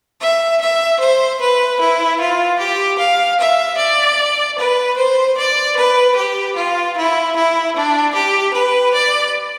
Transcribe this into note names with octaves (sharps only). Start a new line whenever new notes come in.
E5
E5
C5
B4
E4
F4
G4
F5
E5
D5
B4
C5
D5
B4
G4
F4
E4
E4
D4
G4
B4
D5